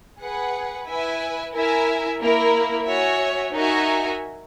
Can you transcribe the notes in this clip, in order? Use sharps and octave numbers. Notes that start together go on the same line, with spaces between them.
G#4 B4 F#5
E4 B4 E5 G#5
E4 A#4 E5 G#5
A#3 E4 A#4
F#4 C#5 E5 G#5
D#4 F#4 A#4 E5 G#5